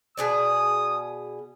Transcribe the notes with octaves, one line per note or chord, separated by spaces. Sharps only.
B2 G#4 D5 D#6